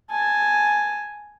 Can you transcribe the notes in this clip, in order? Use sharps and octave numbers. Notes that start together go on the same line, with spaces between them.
G#5 A5